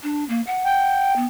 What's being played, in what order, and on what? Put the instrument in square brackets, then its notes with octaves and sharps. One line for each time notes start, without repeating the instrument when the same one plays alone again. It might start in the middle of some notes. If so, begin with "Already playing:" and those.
[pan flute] D4
A#3
F#5
[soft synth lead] G5
[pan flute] B3